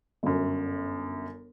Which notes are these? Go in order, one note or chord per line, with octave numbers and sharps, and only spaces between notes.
G1 F#2